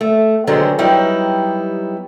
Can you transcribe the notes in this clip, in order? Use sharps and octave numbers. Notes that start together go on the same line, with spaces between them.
A3
D3 D#3 F#3 G#3 B3 C5
F#3 G3 B3 D#4 E4 G4